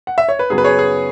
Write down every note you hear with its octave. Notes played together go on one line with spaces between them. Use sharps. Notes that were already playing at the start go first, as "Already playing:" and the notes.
F#5
E5
C#5
B4
F#2 C#3 F#3 B3 G#4
B4
G#4 C#5
G#4